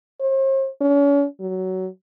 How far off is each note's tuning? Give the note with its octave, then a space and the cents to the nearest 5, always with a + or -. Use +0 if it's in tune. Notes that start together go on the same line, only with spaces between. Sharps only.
C5 +45
C#4 +40
F#3 +15